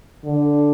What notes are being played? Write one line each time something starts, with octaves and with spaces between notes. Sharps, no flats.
D3